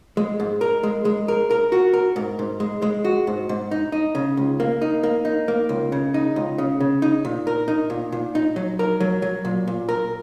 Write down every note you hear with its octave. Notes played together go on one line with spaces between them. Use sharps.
G#3
G#2
A#4
G#3
G#3
A#4
A#4
F#4
A#4
G#2
G#2
G#3
G#3
F#4
G#2
G#2
D#4
D#4
C#3
C#2
A#3
D#4
A#3
D#4
A#3
C#2
C#3
D#4
C#2
C#3
C#3
D#4
A#2
A#4
D#4
A#2
A#2
D#4
F#3
A#4
F#3
F#3
A#2
A#2
A#4